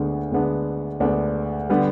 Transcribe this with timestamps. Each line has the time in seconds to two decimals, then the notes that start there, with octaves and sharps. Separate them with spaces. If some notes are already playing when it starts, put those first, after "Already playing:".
Already playing: D2 D3 G#3 B3 D4
0.32 D2 D3 G#3 B3 D4
1.00 D2 D3 G#3 B3 D4
1.70 D3 G3 B3